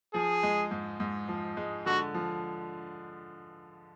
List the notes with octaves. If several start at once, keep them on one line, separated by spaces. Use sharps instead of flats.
F3 G#4
G#3
G#2
G#2
F3
G#3
D3 F#4
F3